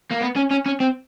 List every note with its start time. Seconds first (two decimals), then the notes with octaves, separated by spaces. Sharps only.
0.11 A#3
0.22 B3
0.36 C#4
0.51 C#4
0.66 C#4
0.80 C4